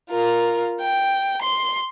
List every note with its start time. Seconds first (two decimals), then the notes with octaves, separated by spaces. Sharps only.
0.11 F4 A#4
0.81 G5
1.41 C6